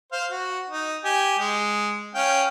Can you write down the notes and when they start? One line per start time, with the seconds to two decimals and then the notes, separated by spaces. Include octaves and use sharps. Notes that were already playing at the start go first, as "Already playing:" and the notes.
0.12 C5 F5
0.31 F#4
0.70 D#4
1.05 G4 G#5
1.39 G#3
2.15 C#4 F5 G5